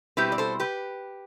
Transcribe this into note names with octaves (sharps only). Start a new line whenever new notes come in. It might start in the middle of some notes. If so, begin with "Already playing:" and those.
B2 G3 C4 E4 G4 B4
D5
A4 C5
G4 B4